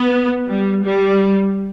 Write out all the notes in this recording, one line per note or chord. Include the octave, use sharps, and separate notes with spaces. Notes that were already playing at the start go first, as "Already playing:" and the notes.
Already playing: B3
G3
G3